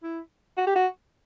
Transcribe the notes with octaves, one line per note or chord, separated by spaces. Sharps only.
E4
F#4
G4
F#4